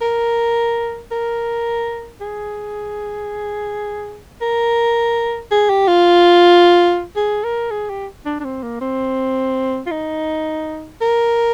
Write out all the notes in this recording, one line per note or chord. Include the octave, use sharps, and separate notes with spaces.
A#4
A#4
G#4
A#4
G#4
G4
F4
G#4
A#4
G#4
G4
D4
D4
C4
A#3
C4
F4
D#4
A#4